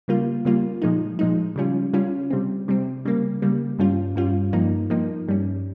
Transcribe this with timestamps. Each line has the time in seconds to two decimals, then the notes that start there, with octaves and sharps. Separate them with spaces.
0.08 C#3 G3 A#3 F4
0.45 C#3 G3 A#3 F4
0.82 A#2 F3 G#3 D#4
1.19 A#2 F3 G#3 D#4
1.56 C#3 G3 C#4 F4
1.93 C#3 G3 C#4 F4
2.30 C3 G3 C4
2.68 C3 G3 C4
3.05 C#3 G3 A#3
3.42 C#3 G3 A#3
3.79 G2 G3 C#4 F4
4.15 G2 G3 C#4 F4
4.53 G2 F3 A#3 D#4
4.90 G2 F3 A#3 D#4
5.28 G2 G3 C#4